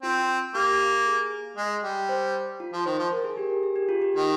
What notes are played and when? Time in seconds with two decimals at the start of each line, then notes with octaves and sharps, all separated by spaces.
0.02 C4 F4
0.55 A#3 G4
1.06 G#4
1.57 G#3
1.83 G3
2.09 C5
2.60 F4
2.73 F3
2.85 D#3 C5
2.99 F3
3.12 A#4
3.24 G#4
3.37 G4
3.50 A#4
3.63 G#4
3.76 G4
3.89 F4
4.02 G4
4.15 D#3 G4